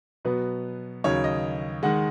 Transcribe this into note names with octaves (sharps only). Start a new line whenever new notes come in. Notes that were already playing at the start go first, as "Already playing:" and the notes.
B2 F#3 B3 B4
D#2 C#3 F#3 C#5
D#5
D#3 G#3 F#5